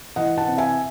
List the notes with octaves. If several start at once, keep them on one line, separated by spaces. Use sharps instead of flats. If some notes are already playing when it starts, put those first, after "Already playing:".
E3 D#5 F#5
F#5 A5
C3
E5 G#5